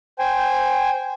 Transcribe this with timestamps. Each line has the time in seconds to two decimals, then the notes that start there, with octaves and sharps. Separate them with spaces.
0.19 C5 G5 G#5